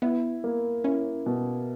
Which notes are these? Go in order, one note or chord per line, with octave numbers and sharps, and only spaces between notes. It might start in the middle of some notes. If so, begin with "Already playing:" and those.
B3 E4
A#3
C#4 E4
B2